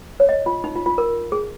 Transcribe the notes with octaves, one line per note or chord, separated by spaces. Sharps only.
C#5
D#5
F4
D#4
F4
F4
A#4
G#4